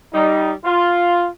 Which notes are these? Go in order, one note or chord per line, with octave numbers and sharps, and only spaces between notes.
G3 D#4
F4